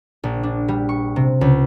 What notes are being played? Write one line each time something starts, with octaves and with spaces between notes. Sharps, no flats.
A#1
D4
G3
C#6
C3
C#2